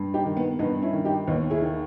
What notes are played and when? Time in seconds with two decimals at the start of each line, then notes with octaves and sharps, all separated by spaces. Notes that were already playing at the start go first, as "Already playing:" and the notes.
Already playing: G2
0.14 D#4 G4
0.25 D#3
0.37 B3
0.59 G2 B3 D#4
0.82 C#4 E4
0.93 D#3
1.05 D#4 G4
1.28 D#2 B3 D#4
1.50 E4 G#4
1.62 D#3